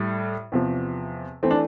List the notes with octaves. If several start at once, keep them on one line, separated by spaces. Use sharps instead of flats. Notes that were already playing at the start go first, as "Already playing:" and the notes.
Already playing: A2 G3
E2 C3 F3
E3 A3 C4
D4